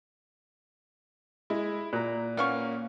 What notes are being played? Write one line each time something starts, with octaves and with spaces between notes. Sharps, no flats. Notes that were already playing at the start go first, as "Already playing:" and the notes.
G#3 E4
A#2 A#5 F#6
A#3 B3 C#4 F5 C#6